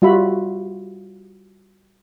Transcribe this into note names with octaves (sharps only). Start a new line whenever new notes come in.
G3 F4 F#4 E5 B5